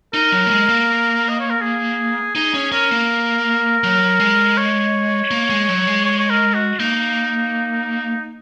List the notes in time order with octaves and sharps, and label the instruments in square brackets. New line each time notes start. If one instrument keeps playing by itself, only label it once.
[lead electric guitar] D#4 [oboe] A#4
[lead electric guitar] F#3
A#3
G#3
A#3
[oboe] D#5
C#5
A#4
G#4
[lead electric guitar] D#4 [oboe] G#4
[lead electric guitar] C#4
[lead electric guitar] C#4 [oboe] A#4
[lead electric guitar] A#3
F#3
G#3
[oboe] C#5
[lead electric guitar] A#3
G#3
F#3
G#3
[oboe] C#5
C#5
A#4
F#4
[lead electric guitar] A#3 [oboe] D#4